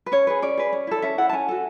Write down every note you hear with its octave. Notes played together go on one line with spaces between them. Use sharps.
B4
C#4 C#5
G#4 B4
C#4 D5
G#4 B4
C#4
E4 A4
C#4 E5
E4 A4 F#5
A5
C#4 G#5
F#4 A4